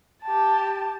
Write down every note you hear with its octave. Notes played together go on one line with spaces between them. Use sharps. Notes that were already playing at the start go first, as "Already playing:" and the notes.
G4 A5